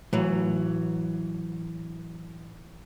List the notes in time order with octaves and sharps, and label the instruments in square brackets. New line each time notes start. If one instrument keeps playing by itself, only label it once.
[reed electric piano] A2 [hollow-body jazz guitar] E3 F#3